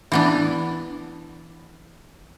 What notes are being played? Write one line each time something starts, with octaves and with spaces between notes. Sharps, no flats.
E3 B3 D4